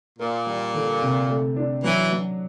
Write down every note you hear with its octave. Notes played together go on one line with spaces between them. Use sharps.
A#2 A#3
G3
D3
C3
A3
D4
E3 F#3
F#3